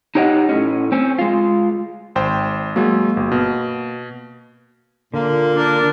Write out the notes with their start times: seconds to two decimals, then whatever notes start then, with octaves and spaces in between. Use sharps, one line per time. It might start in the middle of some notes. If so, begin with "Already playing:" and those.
0.15 D#4 G4 C#5 D#5 F#5
0.49 A2 C#4
0.92 C4 C#4
1.19 G#3 F4
2.16 G#1 C5 G5
2.76 F#3 G#3 A#3 F#4
3.17 G1
3.32 B2
5.14 A#2 D3 A#3
5.56 D4 A#4